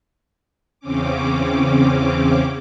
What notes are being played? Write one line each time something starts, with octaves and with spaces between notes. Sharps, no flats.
E2 C#3 C4 C#4 D6